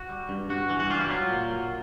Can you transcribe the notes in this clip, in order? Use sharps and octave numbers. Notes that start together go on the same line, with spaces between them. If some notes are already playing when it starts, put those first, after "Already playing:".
Already playing: F#4
G3
G2
G2 F#4
E3
F#4
G3 F4
E4
F#3 F4
A#2
F#3